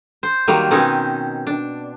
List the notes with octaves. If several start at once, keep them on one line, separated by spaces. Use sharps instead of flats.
C5
D#3 F#3 G3 A#3
B2 D#3 C4 C#4 D#4
D4